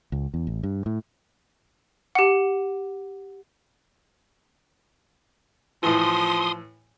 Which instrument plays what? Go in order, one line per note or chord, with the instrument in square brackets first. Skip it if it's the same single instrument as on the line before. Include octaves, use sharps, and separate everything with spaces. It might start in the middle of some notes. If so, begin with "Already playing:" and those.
[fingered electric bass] C#2
E2
A1
G2
A2
[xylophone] G4 F#5
[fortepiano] A2 E3 [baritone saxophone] F3 [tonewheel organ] C6 D#6